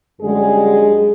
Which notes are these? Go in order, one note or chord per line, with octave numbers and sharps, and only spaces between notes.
F#2 D3 G3 G#3 G#4